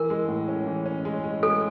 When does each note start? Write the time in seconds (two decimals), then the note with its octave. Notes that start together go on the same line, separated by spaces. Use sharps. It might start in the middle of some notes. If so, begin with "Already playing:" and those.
Already playing: E3 A#4
0.10 G#3
0.28 A2
0.48 C#4
0.67 E3
0.86 C#4
1.05 G#3
1.24 G#3
1.43 G#3 A4